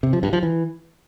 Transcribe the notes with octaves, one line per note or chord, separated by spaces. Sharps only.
C3
F3
G2
F3
E3